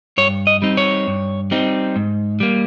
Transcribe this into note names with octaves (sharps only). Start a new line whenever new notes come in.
G2 C#5
D#5
G3 C4 D#4
C#5
G2
G3 C4 D#4
G#2
G3 A#3